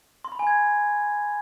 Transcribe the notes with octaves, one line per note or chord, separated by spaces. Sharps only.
C6
B5
G#5
G#6